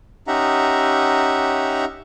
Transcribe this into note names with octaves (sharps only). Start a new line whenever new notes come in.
C#4 D#4 G4 E5 F#5 A#5